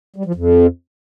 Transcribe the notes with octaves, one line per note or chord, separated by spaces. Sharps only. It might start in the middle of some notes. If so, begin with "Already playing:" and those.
G3
F3
F2